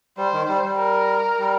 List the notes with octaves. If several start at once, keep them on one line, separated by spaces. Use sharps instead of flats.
G3 C5
D#3
G3
G3
A#4
G3